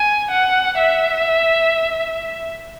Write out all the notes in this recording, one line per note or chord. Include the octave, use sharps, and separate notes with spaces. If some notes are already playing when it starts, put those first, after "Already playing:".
Already playing: G#5
F#5
E5